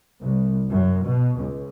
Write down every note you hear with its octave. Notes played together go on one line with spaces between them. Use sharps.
C2
F#2
B2
C#2